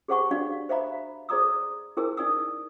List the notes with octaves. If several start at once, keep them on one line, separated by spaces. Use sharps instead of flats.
G4 G#4 C5 F#5 A5 C#6
D4 F#4 D5 F5
C5 E5 F5 A#5 B5
G#4 C5 D5 A#5 D#6 E6
E4 G#4 A#4 C5 G#5 E6
D#4 D5 G#5 D#6 E6